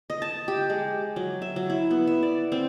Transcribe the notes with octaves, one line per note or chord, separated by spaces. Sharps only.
D#5
A5
G4
G#3
F#3
E5
F#3
E4
B3
E5
D5
C4